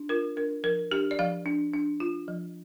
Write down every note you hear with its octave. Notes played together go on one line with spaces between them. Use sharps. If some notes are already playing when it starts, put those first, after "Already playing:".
Already playing: D4
F4 A#4
D4 A#4
F3 A#4
D4 G4
D5
F3 F5
D4
D4
F4
F3